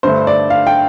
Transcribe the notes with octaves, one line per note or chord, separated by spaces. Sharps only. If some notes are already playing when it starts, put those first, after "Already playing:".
G2 D3 A3 C5
D5
F5
G5